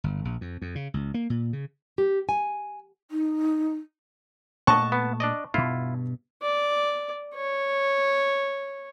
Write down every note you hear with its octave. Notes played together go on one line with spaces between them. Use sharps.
G1
A#1
F2
F2
C#3
C#2
A#3
A#2
C#3
G4
G#5
D#4
A#2 A3 D#5 F#5 A5 C#6
B3
D4 D5 D#5
G2 B2 E4 F4
D5
C#5